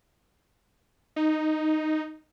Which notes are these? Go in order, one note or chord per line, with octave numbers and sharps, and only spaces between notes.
D#4